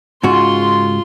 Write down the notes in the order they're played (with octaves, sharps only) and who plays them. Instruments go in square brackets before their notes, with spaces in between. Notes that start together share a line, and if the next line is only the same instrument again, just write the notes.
[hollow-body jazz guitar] G#2 C#3 F#4 [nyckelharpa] F4 C6